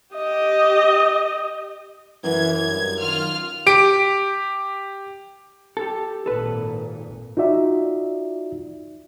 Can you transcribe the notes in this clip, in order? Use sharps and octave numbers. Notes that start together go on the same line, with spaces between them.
G4 D#5
F#2 E3 G#6
G2
D#3 F4 F6
G4 D7
G4 A4
G#1 A#2 A4 B4
D#4 F4 F#4 D5 E5